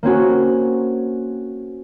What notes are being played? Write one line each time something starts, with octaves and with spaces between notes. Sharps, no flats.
A#3 C4 C#4 F#4